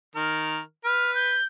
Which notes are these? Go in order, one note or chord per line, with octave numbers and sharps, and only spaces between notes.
D#3 A#4 F6
B4 F6
G6